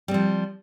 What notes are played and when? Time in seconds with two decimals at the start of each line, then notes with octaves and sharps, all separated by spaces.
0.08 G3
0.11 C4
0.14 F3